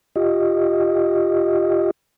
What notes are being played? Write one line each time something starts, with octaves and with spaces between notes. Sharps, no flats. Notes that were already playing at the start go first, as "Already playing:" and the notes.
F4 G4 D#5